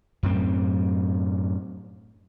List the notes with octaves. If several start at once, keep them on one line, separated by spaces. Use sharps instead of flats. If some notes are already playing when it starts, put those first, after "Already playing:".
F#2 A2 C4